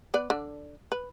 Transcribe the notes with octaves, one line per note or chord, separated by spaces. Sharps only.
B3 B4 D5
D3 D4
B4